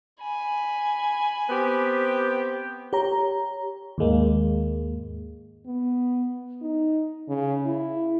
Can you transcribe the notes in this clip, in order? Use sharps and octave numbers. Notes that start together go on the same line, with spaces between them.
G#5 B5
B3 C4 G4
G4 C#5 A#5
D#2 G#2 G#3 A#3
B3
D#4
C#3
E4